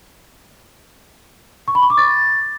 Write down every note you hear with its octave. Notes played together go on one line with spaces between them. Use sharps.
C#6
B5
C#6
D6
A6